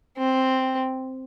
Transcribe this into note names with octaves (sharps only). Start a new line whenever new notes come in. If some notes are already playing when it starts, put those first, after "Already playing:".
C4